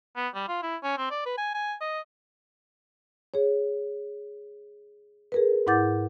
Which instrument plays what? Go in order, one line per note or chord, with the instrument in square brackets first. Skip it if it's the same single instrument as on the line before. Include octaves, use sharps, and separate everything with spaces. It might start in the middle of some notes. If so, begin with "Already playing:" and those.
[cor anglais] B3
G3
F4
E4
C#4
C4
D5
B4
G#5
G#5
D#5
[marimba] G#4 C#5
G#4 A#4 B4
G#2 E4 F#5 D6 G6 A6